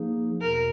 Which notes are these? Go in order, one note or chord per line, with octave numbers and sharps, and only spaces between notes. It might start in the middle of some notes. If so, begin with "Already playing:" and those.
Already playing: F3 A#3 D#4 G#4
E2 B2 A#4